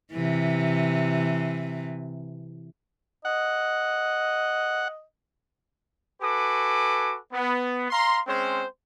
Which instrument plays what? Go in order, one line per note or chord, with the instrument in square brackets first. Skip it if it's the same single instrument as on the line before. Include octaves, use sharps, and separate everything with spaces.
[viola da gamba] C3 E3
[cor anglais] D#5 [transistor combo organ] F#5
[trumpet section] F#4 A4 B4 G#5 D6
B3
F5 A#5 C6
G#3 C4 C#4 C5